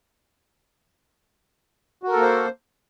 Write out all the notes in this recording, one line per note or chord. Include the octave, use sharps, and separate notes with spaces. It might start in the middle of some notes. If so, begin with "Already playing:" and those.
A#3 F#4 A4 A#4 C5